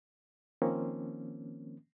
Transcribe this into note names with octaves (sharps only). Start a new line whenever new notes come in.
D#3 F3 A#3 C4 C#4